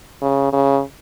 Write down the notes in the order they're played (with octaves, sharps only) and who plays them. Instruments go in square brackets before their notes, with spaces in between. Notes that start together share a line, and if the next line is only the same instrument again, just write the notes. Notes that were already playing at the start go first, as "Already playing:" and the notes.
[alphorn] C#3
C#3